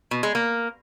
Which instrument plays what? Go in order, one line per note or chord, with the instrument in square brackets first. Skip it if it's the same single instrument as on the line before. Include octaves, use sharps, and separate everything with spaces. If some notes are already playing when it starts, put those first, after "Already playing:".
[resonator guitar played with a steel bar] B2
G#3
A#3